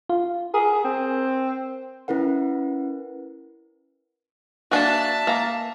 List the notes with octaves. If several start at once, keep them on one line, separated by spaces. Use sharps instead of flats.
F4
G#4 A#4
C4
C#4 E4 A#4 B4 F#5
A#3 D4 F#4 E5 A5
A#3 A#5